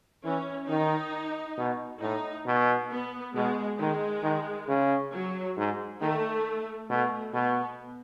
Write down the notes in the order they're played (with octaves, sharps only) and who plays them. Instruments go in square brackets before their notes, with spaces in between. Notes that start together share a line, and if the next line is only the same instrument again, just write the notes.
[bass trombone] E3 [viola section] C#4
[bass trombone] D#3 [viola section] D#4
[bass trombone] B2
[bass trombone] A2 [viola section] D#4
[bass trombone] B2
[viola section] B3
[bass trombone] B2 [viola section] G#3
[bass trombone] D#3 [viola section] G#3
[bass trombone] D#3
C#3
[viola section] F#3
[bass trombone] G#2
[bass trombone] D#3 [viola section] A3
[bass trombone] B2 [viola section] A3
[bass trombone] B2 [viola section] B3